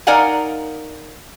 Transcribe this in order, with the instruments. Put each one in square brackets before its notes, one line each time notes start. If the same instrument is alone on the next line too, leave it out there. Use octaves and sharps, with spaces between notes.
[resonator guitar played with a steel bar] D#4 A#4 D5 F5 F#5 G#5